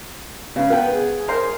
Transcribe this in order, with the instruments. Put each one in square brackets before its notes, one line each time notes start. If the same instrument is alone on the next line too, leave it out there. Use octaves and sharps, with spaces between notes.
[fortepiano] C#3 [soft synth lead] B4
[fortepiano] B3 G5
[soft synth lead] G#4
[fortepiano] A#4 C5